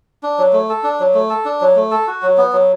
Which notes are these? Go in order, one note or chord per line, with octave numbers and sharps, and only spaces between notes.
D4
F#3
A3
A4
D4
F#3
A3
A4
D4
F#3
A3
A4
F#4
F#3
B3
F#3